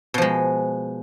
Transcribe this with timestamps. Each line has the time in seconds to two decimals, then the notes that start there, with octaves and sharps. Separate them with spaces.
0.14 B2
0.18 F3
0.22 G#3